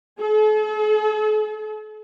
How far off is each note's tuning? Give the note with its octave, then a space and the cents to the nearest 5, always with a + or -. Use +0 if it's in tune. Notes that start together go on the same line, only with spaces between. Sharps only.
A4 -45